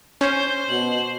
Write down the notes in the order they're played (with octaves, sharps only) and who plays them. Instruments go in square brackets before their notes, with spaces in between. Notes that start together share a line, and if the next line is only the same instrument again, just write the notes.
[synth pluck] C#4 [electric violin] C5 [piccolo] G6
[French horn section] B2 [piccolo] F#7